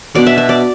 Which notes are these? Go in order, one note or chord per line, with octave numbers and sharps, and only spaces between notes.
B2 B3 D4 D5
E5
E5
D5